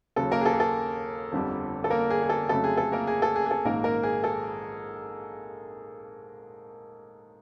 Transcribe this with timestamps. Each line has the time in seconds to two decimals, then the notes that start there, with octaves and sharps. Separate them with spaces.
0.16 D#2 C#3 F#3 A4
0.31 A#3 A#4
0.41 G#4
0.45 A4
0.53 G#4
0.60 A4
1.32 G1 F2 D3 G3
1.84 A4
1.90 A#3 A#4
2.10 G#4
2.23 G#4
2.29 A4
2.49 F2 C#3 F#3 A3 A4
2.64 G#4
2.77 A4
2.92 A#3 A#4
3.07 G#4
3.22 A4
3.36 G#4
3.46 G#4
3.51 A4
3.65 A#1 G#2 D#3 A#3 A#4
3.84 A#3 A#4
4.03 G#4
4.24 A4